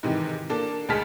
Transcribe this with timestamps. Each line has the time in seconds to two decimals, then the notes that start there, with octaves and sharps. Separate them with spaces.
0.03 G#2 C3 D#3 E3
0.50 A#3 D4 A4
0.89 D2 G#3 G#4 A5 F6 B6